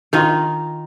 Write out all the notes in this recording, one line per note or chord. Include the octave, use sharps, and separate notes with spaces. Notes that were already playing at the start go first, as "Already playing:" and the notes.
D#3 D#4 F4